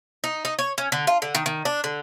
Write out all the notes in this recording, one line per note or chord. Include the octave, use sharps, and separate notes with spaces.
D#4
D#4
C#5
C#4
D3
F4
D3
D#3
D#3
D4
D3